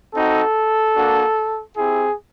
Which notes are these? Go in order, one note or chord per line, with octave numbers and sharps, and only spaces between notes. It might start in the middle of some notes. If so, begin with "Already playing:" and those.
C4 D#4 F#4 A4
A#3 D4 F#4
C4 E4 G4 G#4